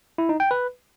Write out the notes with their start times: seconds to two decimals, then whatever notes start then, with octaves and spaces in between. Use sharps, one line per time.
0.18 E4
0.29 D#4
0.40 G5
0.51 B4